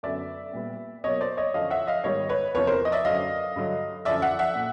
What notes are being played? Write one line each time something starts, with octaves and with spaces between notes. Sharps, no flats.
F#2 D3 F#3 B3 D5 E5
A#2 G3 B3
B2 F#3 A#3 C#5 D#5
C5 D5
C#5 D#5
F#2 D3 F3 D#5 F5
E5 F#5
D#5 F5
G#2 D#3 G3 B3 C#5 D#5
B4 C#5
E2 C3 F3 B4 C#5
A#4 C5
D#5
D5 E5
F#2 D3 F#3 D#5 F5
G2 D3 F#3
F#2 D3 F3 D5 E5
E5 F#5
E5 F#5
A#2